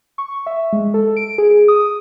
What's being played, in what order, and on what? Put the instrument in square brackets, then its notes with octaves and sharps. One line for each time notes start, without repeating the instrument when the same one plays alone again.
[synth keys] C#6
E5
G#3
A4
D7
G#4
D#6